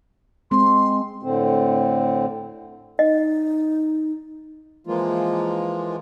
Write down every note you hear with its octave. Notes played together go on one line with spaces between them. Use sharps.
G#3 C4 C6
A2 D3 C4
D#4 D#5
E3 F3 G#3 A#3 F4